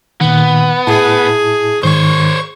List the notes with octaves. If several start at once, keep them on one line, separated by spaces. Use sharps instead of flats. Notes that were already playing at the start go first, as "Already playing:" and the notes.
A#2 D#3 B3
A2 E4 G#4 A5
G#2 D#3 C5 C#5 C#6